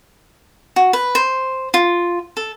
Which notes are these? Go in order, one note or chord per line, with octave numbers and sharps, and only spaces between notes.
F#4
B4
C5
F4
A4